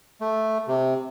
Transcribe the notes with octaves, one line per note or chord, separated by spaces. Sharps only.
A3
C3